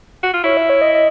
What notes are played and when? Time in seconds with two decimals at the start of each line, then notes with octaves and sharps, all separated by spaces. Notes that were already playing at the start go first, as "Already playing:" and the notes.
0.23 F#4
0.34 F4
0.44 E4 C#5
0.57 E5
0.70 C#5
0.82 D#5
0.94 D#5